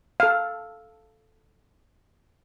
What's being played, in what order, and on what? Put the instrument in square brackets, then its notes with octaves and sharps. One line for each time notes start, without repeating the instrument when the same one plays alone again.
[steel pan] A4 F5